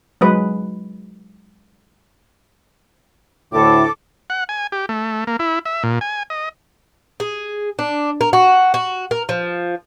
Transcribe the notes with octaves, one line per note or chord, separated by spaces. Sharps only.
F#3 G#3 B4
D2 A2 A4 D6
F#5
G#5
G4
A3
A#3
E4
E5
A#2
G#5
D#5
G#4
D4
A#4
F#4
F#4
A#4
F3